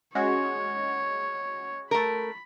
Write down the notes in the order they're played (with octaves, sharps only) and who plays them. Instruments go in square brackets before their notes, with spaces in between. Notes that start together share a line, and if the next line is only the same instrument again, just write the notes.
[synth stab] G#3 C#4 F#4 [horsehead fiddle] C#5
[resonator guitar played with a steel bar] A3 A#4 [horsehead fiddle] B5